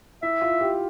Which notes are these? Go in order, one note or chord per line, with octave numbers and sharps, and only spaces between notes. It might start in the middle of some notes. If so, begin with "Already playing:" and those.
E4 E5
F4
G4